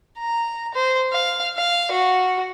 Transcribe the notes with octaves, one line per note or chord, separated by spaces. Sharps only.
A#5
C5
F5
F5
F#4